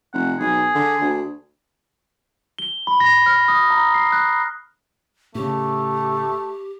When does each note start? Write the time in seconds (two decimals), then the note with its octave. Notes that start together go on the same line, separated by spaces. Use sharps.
0.14 F1 F#5
0.40 B1 G#4
0.75 D3
1.01 D2
2.59 G7
2.87 B5
3.00 A#6
3.26 F6
3.48 D#6
3.71 A#5
3.94 C7
4.12 F#6
5.35 A2 C#3 A3 G4